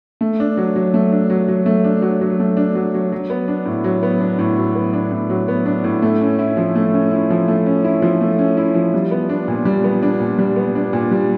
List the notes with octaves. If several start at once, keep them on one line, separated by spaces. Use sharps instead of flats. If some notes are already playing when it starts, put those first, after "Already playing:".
A3
D4
F#3
F#3
A3
D4
F#3
F#3
A3
D4
F#3
F#3
A3
D4
F#3
F#3
F#3
B3
D4
A2
F#3
B3
D4
A2
F#3
B3
D4
A2
F#3
B3
D4
A2
A3
C#4
E4
F3
A3
C#4
E4
F3
A3
C#4
E4
F3
A3
C#4
E4
F3
G3
B3
D4
A#2
G3
B3
D4
A#2
G3
B3
D4
A#2
G3